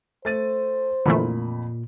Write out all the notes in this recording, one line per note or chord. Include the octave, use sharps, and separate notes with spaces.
A3 C5 A6 D#7
F2 A#2 D3 E3 A3 A#3 B5